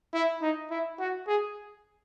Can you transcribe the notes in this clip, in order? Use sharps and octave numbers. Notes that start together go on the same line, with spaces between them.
E4
D#4
E4
F#4
G#4